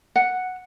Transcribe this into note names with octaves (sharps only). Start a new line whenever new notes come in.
F#5